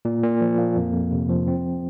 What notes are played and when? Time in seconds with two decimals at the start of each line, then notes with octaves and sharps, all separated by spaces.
0.05 A#2
0.23 A#2
0.41 F3
0.58 A#3
0.76 F2
0.94 F2
1.11 C3
1.30 F3
1.47 C4